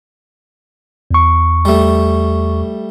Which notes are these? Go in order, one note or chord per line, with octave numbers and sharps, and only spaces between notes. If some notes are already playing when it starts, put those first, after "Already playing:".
E2 C#6
G3 A3